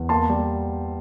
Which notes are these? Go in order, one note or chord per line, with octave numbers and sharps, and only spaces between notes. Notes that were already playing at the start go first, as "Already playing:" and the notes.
Already playing: E2
A#3 A5 C6
G3